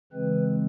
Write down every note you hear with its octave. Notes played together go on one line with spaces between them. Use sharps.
C#3 E3 G#3 C4 B4